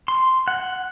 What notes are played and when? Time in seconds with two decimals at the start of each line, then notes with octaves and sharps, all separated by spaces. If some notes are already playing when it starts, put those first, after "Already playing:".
0.08 C6
0.48 F#5